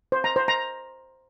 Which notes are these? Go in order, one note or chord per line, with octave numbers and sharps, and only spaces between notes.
C5
A#5
C5
A#5